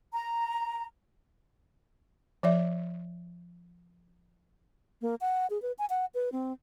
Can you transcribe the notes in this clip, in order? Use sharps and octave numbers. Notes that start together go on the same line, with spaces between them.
A#5
F3 D5 E5
A#3
F#5
G#4
B4
G#5
F#5
B4
C4